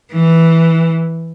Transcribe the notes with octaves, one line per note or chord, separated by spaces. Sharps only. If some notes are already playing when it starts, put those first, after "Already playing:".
E3